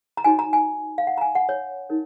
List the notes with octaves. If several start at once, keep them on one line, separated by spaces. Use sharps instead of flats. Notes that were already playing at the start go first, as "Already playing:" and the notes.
A#5
D#4 F#4 C#5 G#5
A#5
G#5
F5
F#5
A#5
G#5
F#5
C#5
D#4 A#4 C#5